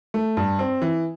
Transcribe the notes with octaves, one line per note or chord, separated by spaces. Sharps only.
A3
G2
C4
E3